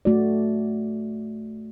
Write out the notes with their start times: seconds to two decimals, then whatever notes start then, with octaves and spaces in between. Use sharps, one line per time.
0.05 A3 F#4 D5